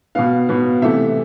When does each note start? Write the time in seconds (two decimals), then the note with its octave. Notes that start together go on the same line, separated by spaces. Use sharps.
0.15 B2 B3 F5
0.49 B2 B3
0.82 C3 E3 A3 E5